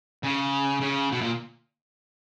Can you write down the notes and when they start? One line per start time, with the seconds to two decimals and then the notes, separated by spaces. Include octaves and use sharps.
0.23 C#3
0.81 C#3
1.12 B2
1.21 A#2